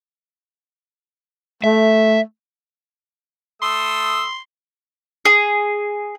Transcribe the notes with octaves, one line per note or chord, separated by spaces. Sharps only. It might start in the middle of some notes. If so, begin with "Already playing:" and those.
A3 E5
A3 C6 D#6 E6
G#4